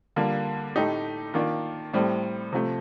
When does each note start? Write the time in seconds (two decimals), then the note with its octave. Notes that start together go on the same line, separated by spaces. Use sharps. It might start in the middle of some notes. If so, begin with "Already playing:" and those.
0.16 D3 G3 A#3 F4
0.76 A2 A3 D#4 G4
1.34 D#3 A#3 D4 F4
1.93 A2 G3 C4
2.52 C3 F3 A3